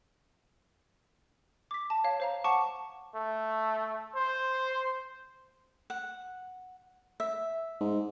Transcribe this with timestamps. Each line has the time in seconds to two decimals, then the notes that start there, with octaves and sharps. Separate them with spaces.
1.71 D6 B6
1.90 A5
2.04 C#5 F5
2.20 C5 F5 A#5
2.44 F#5 A5 C#6 D6
3.15 A3
4.15 C5
5.90 F#5
7.20 E5
7.80 G#2